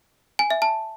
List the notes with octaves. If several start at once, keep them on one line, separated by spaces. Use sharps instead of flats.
G#5
E5
A5